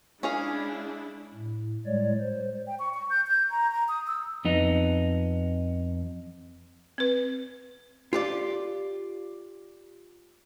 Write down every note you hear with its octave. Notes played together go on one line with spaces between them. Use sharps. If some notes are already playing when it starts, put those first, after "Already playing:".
G#3 C#4 D4 E4 G#4 F5
A2
A2 G3 G#3 C#5 D5
C5
G5
C#6
C#6
G6
G6
A#5
A#5
D#6
E6
F2 B3 D#4
C4 B4
F4 G4 D5